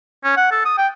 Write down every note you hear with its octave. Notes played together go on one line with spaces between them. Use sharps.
C#4
F#5
A4
D#6
G5